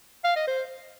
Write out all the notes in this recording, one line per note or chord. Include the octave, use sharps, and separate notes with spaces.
F5
D#5
C5